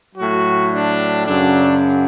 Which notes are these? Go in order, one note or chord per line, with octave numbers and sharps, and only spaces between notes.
A2 F#3 F#4
D4
F#2 C#3 F#3 D4